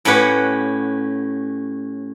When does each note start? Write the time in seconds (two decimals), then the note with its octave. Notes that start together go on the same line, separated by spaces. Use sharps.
0.05 A2 C#4 G4 B4 F#5